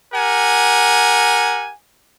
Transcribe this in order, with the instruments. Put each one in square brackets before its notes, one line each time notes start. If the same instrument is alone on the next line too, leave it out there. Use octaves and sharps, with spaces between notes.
[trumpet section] G4 A#4 F#5 G#5